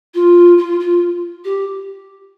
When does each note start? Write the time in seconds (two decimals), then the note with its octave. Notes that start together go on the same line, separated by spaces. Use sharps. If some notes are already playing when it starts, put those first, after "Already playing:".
0.14 F4
0.58 F4
0.80 F4
1.45 G4